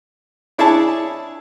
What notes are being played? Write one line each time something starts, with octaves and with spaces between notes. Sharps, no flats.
D4 E4 G#4 C#5 E5 A5